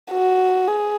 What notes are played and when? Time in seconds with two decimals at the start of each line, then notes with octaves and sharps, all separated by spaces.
0.11 F#4
0.68 G#4